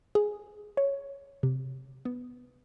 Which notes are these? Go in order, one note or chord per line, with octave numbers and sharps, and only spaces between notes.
G#4
C#5
C3
B3